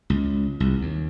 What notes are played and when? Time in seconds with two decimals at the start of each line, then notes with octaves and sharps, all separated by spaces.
0.10 C#2
0.60 C2
0.81 D#2